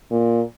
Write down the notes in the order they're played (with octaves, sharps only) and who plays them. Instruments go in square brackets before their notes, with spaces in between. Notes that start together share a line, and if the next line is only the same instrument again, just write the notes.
[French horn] A#2